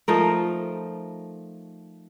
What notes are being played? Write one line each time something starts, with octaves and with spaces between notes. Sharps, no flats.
F3 A3 D#4 A#4